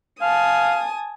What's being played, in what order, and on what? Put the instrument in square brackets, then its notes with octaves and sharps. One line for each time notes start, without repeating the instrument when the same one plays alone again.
[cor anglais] F5 [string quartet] G#5 A5 D#6